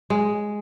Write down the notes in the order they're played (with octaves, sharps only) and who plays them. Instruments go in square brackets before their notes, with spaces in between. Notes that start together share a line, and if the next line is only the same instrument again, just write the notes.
[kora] G#3